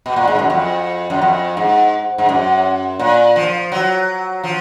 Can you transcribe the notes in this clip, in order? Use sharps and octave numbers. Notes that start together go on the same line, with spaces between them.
B2
A#2
G#2
F#2
F2
F#2
F2
G#2
G#2
F#2
A#2
F3
F#3
F3